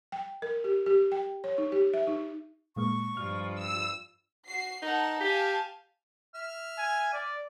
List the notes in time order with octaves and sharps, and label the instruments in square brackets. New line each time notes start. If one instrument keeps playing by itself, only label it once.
[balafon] G5
A#4
G4
G4
G5
C#5
D#4
G4
E5
D#4
[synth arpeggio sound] A#2 G#3 A#3 [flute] C#6
[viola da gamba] G2 F3 F4 [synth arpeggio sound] F6
[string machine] E6
[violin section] F#4 C7
[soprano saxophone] D#4 [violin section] A#4 F#5 A5
[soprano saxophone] G4 [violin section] F5 G#5 A5
[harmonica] E5 F6
[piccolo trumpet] G#5
D5